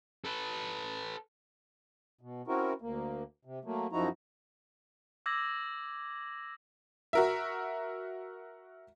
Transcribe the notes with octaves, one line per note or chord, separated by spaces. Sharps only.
A4 B4
B2
C4 C#4 E4 F#4 A#4
D2 A#3
C3
F#3 A3 A#3
F#2 F3 D#4 E4 F#4 A#5
D6 E6 G#6 A#6 F#7
F#4 A#4 E5